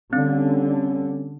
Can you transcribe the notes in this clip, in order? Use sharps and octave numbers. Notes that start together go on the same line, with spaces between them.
D3 G3 C4 C#4